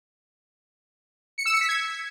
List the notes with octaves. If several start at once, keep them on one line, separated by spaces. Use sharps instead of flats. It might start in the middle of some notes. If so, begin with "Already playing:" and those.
C#7
E6
C#7
B6
G#6